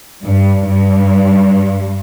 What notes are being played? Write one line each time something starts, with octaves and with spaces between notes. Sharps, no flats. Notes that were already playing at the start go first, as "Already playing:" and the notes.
G2
G2